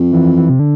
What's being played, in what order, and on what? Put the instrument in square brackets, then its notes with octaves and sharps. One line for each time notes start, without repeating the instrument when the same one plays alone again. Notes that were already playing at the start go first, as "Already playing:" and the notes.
Already playing: [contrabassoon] F2
[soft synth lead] E3
E3
C3
D3